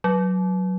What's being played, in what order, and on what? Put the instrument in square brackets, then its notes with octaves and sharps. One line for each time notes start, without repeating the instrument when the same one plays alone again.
[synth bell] F#3